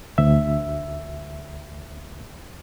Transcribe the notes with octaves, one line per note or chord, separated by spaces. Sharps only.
D2 E5